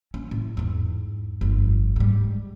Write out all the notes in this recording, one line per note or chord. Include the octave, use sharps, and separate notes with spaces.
C#4
A2
E2 G#2
G1 F2
G#2 G3